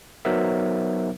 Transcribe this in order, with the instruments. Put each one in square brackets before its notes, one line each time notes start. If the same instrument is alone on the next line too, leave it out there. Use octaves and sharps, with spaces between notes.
[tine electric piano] F#3 B3 D#4 A#4 C5 E5